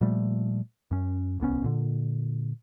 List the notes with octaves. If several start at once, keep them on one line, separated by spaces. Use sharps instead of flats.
A#2 F3 G3 A3
F#2 C#4
D1 C2 B3 C#4
A#2 D3